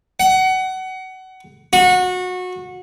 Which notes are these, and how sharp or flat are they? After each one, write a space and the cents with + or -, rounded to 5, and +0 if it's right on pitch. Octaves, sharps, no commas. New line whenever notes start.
F#5 +25
F#4 -25